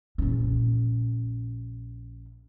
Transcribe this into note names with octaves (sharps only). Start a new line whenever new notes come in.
A#1 C#4